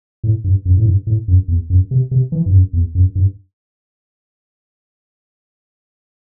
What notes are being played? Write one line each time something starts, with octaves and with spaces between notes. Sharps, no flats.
A2
G2
F#2
A2
G2
A2
F#2
E2
F#2
C3
C3
E3
G2
F#2
E2
F#2
G2